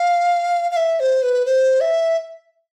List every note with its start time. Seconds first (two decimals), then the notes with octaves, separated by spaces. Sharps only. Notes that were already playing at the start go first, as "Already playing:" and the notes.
Already playing: F5
0.71 F5
0.77 E5
1.00 C5
1.23 B4
1.46 C5
1.81 E5